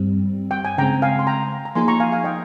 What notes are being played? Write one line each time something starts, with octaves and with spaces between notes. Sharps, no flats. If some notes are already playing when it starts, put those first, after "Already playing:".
Already playing: G2 G3 C4
G5
G#5
C#3 G#3 C4 G5 A#5
F5 G#5
C6
G5 A#5
A#5
F3 A#3 D#4 G#4 G#5 C6
A#5 C#6
F5 G#5
F5 G#5
D#5 G5